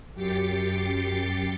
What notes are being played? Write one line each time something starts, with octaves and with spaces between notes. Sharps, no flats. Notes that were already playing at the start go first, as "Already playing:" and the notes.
F#2 G4 G5 A6 C7 C#7